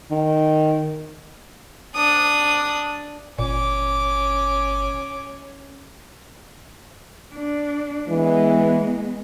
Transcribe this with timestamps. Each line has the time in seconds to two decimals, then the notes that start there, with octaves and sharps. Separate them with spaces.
0.11 D#3
1.96 D4 D#6
3.39 G1 A#2 C#4 D6
7.35 D4
8.09 E3 G#3 B3